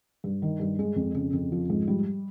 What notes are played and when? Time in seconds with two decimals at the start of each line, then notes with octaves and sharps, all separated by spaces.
0.24 G2
0.42 D#3
0.60 G2
0.79 G#3
0.96 F2
1.15 C#3
1.33 F2
1.52 F3
1.70 G#2
1.88 G3